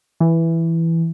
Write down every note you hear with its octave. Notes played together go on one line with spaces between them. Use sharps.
E3